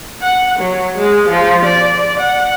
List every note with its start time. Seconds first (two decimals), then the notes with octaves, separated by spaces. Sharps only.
0.22 F#5
0.59 F#3
0.97 G#3
1.28 F3
1.65 D5
2.20 F#5